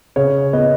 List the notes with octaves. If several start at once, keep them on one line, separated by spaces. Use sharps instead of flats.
C#3 C#5
B3 D#5